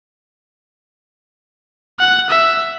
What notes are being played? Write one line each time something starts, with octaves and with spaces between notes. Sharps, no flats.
F#5
E5